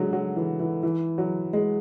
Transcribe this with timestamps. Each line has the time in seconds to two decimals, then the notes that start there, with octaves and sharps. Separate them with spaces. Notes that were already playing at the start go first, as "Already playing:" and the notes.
Already playing: D3 F#3 G#3
0.13 F#3
0.36 E3
0.60 E3
0.83 E3
1.18 F#3
1.53 G#3